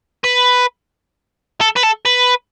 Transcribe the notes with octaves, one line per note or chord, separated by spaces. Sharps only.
B4
A4
B4
A4
B4